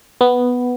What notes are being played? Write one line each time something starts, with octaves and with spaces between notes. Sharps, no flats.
B3